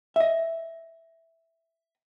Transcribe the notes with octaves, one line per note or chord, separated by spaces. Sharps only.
D#5 E5